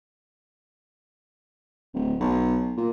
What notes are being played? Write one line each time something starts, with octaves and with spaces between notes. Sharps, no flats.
D1
B1
A#2